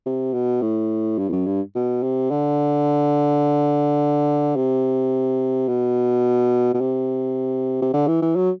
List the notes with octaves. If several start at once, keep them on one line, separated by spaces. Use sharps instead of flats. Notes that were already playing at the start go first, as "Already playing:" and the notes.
C3
B2
A2
G2
E2
F#2
G2
B2
C3
D3
C3
B2
B2
C3
C3
D3
E3
E3
F#3